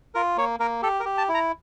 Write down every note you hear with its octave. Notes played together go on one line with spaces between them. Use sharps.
F4 A#4
A#3 C#5
A#3 A#4
G4 A4
A#4
G4
A5
E4
A#5